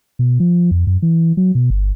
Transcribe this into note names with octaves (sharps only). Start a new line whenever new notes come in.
B2
F3
F2
F#2
E3
F#3
B2
G1